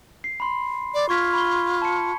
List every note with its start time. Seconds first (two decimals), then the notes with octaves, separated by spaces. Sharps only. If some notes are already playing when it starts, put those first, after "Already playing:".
0.24 C7
0.40 B5 C6
0.94 D5
1.09 F4 C#6 G#6 B6
1.33 B5 C#6 G7
1.82 A5 C#7